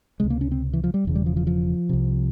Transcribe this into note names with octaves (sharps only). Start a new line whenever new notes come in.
C#2 C3 G#3
A#3
C#4
C4
E3
F3
G3
E1 E2 C#3
G3
F3
F3
F3
C2 C3